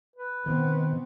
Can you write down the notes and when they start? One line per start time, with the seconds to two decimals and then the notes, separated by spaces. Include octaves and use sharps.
0.16 B4
0.46 B2 D#3 B3 C4